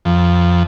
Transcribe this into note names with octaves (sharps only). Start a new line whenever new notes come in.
F2